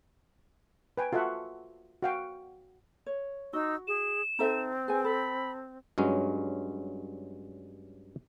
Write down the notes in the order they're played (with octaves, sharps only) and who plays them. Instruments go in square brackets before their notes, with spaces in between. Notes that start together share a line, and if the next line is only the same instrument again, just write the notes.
[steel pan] B4 G5 G#5
F4 F#4 A4 E5 F#5
F#4 F5 G5
[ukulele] C#5
[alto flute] D#4 [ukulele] F#4 [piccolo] E6
[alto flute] G#4 [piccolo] E7
[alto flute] C4 [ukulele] D#4 A4 E5
[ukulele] G#4 B4 G#5
[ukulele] A4 [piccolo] B5
[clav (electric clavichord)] G2 F#3 G#3 C#4